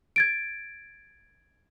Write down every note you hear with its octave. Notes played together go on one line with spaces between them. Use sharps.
G#6 A6 D7